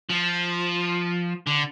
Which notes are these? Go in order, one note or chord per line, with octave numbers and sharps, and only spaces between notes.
F3
D3